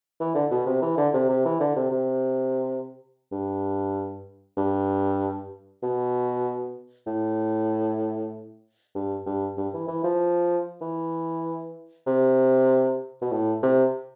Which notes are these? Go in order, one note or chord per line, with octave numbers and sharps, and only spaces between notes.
E3
D3
B2
C3
E3
D3
C3
C3
E3
D3
C3
C3
G2
G2
B2
A2
G2
G2
G2
E3
E3
F3
E3
C3
B2
A2
C3